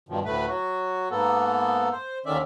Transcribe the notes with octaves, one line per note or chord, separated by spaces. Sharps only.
G2 B2 D#3 F3
D2 A2 A3 B4
F#3 F#4
G#2 A#3 B3 A4
C5
D#2 D3 D#3 C#4 D5 E5